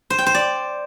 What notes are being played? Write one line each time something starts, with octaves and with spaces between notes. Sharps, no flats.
C5
G5
C5
D5